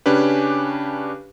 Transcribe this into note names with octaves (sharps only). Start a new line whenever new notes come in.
C#3 C#4 D4 G4 B4